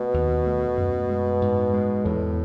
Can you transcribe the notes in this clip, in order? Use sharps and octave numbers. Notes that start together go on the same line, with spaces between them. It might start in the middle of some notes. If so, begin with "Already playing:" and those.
Already playing: B2 A3
D#2
A3
F#2
G#3
G#2
G#3
E2 A2